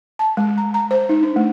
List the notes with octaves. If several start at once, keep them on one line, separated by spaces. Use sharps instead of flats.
A5
G#3
A#5
A#5
C5
D#4
D4
A3